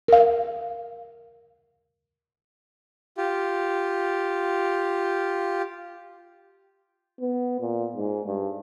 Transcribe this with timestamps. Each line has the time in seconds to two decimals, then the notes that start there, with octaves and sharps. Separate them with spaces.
0.08 A#4 F5
3.17 F4 G4
7.20 B3
7.61 A#2
7.96 G#2
8.27 G2